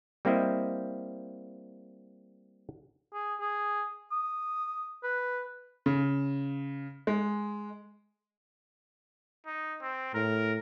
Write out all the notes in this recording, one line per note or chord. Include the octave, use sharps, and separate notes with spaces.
G3 A#3 C4 E4 D#5
G#4
G#4
D#6
B4
C#3
G#3
D#4
C4
A2 A#4